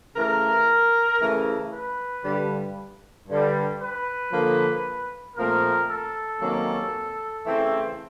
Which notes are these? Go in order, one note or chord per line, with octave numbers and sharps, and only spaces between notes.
C#3 E3 A3 A#4
C#3 E3 A3
B4
G2 D3 G3
G2 D3 G3
B4
D3 F3 A#3
A#2 F3 A3 C4 A#4
A4
C3 D#3 F#3 A#3 C#4
C#3 E3 A3 C4